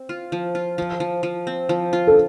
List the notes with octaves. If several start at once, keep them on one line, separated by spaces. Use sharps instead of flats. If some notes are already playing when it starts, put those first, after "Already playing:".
Already playing: C4
F4
F3
F4
F3
F3
F3
C4
F3
F4
A4